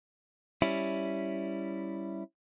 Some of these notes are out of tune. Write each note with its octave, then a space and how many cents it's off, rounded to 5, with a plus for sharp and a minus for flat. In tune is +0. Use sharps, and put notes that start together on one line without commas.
G3 +0 C#4 +0 E4 +0